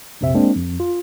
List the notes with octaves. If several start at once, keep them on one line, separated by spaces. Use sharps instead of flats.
A#1 F2 C3 C4 E5
G#3 A#3 C4 D4
F2
F4